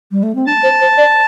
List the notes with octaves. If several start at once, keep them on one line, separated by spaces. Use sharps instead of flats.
G3
A3
C4
D4 A5
C5
C5
D5